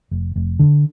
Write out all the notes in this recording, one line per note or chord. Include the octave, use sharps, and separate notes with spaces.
F1
F1
D3